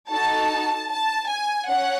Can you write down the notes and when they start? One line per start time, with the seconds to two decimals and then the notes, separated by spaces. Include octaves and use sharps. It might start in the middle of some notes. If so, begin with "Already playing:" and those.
0.11 D#4 F#4 A4 A5
0.91 A5
1.30 G#5
1.69 C#4 F#5